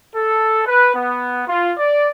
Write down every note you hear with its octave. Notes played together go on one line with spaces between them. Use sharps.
A4
B4
B3
F4
D5